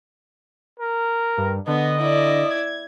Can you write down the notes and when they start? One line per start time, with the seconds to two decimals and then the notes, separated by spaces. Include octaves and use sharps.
0.79 A#4
1.38 G2
1.67 D3 B3 D#5
2.00 E4 D5
2.50 G#6